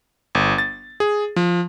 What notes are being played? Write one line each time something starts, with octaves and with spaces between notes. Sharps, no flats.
G1
A6
G#4
F3